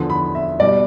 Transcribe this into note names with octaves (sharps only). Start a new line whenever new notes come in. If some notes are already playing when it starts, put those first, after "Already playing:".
Already playing: E2 D3 F3
B5
E5
B2 G3 D5